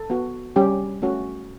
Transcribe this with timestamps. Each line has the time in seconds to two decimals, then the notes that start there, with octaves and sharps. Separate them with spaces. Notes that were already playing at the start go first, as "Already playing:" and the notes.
Already playing: A4
0.10 B3 F#4
0.56 G3 C#4 G4
1.02 A3 C#4 F#4